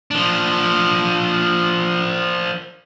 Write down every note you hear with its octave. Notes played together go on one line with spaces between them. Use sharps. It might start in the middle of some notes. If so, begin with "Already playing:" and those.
F3 D4